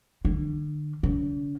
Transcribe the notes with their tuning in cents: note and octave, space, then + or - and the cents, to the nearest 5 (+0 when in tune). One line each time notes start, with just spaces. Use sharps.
D3 +35
D3 -45